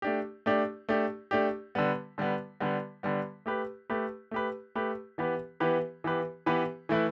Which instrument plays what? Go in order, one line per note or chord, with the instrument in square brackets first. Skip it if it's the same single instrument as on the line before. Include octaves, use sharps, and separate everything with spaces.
[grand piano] A3 D4 G4
A3 D4 G4
A3 D4 G4
A3 D4 G4
D3 G3 B3
D3 G3 B3
D3 G3 B3
D3 G3 B3
A3 G4 B4
A3 G4 B4
A3 G4 B4
A3 G4 B4
E3 B3 G4 B4
E3 B3 G4 B4
E3 B3 G4 B4
E3 B3 G4 B4
E3 A3 E4 B4